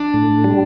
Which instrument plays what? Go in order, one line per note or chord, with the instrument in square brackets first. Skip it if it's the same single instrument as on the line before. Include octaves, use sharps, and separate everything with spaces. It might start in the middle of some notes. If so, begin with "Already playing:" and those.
Already playing: [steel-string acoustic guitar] D4
[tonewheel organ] A2
G3